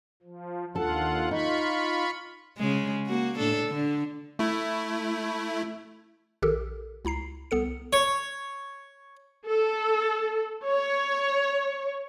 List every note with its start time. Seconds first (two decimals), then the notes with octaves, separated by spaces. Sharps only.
0.23 F3
0.75 D#2 D4 F4 A4 F#5
1.31 D#4 F4 B5 C#6
2.58 C#3 G#3
3.06 A#3 F#4
3.38 A2 D4 A4
3.68 D3
4.39 A3 E4
6.42 A#1 D#3 G4 A4 A#4
7.05 C#2 E4 A#5 C7
7.51 C2 B3 A4 C#7
7.93 C#5
9.47 A4
10.66 C#5